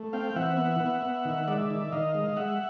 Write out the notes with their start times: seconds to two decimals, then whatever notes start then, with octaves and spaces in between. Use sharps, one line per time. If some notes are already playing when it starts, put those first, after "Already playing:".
Already playing: A3
0.13 C4 F5 G5
0.36 E3 E5 F#5
0.58 B3
0.80 B3
1.02 B3
1.25 D#3
1.48 G#3 D5 E5
1.70 D#3
1.92 D#3 D#5 F5
2.15 G#3
2.37 G#3 E5 F#5